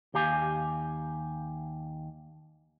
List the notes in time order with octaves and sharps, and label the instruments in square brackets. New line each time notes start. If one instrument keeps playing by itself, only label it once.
[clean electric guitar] D#2 G4 F5 G#5